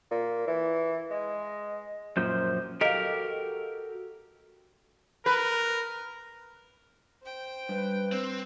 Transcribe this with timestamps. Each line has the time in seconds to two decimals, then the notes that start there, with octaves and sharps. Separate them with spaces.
0.11 A#2
0.47 E3
1.11 G#3
2.17 F#2 A#2 F3 C5 G6
2.81 F#4 G4 A4 A#4 D#5 F5
5.26 A#4 B4
7.22 C5 G5
7.69 G2 B4
8.12 C4